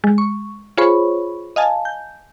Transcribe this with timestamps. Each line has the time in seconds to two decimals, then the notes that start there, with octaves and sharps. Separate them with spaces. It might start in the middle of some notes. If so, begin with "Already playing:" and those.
0.04 G#3
0.18 C#6
0.77 F4 G#4 C5 C#5 B5 C#6
1.56 D#5 F5 G#5 A5
1.85 G6